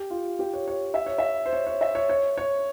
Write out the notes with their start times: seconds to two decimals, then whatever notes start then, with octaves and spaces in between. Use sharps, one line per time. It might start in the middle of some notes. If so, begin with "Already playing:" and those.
Already playing: G4
0.10 F4
0.39 G4
0.54 C#5
0.68 C#5
0.94 E5
1.06 C#5
1.18 E5
1.46 C5
1.53 C#5
1.67 C#5
1.81 E5
1.95 C#5
2.09 C#5
2.38 C#5